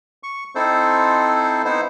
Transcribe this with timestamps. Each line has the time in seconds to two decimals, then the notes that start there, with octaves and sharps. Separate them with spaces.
0.23 C#6
0.55 C4 D#4 E4 A4 C5
1.65 B3 D#4 E4 C5